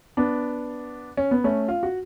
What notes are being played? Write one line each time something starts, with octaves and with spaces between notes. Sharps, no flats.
B3 D4
C#4
B3
A3 C#4
F4
F#4